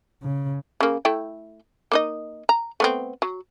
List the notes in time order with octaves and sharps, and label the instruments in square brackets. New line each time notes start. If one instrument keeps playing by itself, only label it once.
[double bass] C#3
[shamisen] C#3 A#3
A3 E4 G5
A#3 D#4 D#5
A#5
A3 B3 C4
F#3